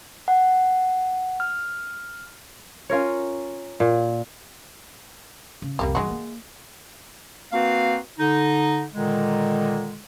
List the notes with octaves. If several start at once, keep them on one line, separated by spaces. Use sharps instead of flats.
F#5
F6
C#4 F4 A#4 C#5
A#2
C#3
C2 F2 G3 A#3 G4
G2 E3 F#3 G#3 F#4
A#3
A#3 C4 F#4 B4 F5
D3 D#4
A#2 D3 D#3 G#3